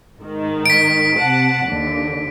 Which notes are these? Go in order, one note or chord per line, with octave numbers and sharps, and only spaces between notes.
G#2 D#3
B6 D7
C3 F#5 A5
D#2 D3